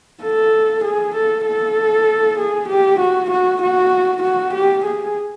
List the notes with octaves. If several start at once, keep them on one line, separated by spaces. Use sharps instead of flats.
A4
G#4
A4
A4
G#4
G4
F#4
F#4
F#4
F#4
G4
G#4